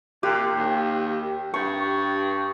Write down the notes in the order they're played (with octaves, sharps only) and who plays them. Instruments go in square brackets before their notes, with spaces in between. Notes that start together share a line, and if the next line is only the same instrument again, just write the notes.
[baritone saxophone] A#2 [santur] G4
[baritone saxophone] D#2
[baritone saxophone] G2 [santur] C#6